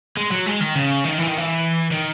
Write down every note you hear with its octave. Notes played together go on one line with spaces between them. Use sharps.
G#3
F#3
G#3
D#3
C#3
D#3
E3
D#3
E3
D#3